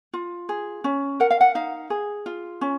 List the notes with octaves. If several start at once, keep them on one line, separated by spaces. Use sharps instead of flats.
F4
G#4
C#4
A#4 F#5
F5
F#5
D#4 F5
G#4
F4
C#4